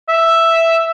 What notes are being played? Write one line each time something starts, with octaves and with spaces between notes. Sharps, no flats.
E5